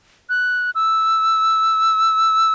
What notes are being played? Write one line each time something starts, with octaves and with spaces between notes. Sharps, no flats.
F#6
E6